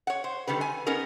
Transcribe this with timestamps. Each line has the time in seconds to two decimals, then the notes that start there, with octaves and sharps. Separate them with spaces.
0.07 C#5 F#5
0.24 C5
0.47 D3 D#3 G3 B4
0.61 G#5
0.87 B3 C#4 D#4 G#4 A#4